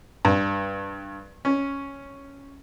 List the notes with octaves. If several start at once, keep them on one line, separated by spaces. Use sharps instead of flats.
G2
C#4